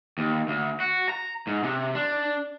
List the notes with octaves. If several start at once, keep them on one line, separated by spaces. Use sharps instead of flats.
D#2
D2
F#4
A#5
G#2
C3
D4